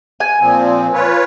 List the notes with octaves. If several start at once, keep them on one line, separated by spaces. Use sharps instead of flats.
G#5
A#2 F3 C4
F4 B4 C#5